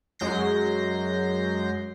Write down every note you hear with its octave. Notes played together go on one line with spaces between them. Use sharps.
F#2 F#3 G#3 G6 A#6 C7